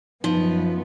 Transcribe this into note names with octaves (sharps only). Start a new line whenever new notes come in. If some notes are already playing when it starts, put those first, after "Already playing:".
F#2 F3 B3 D#4 F4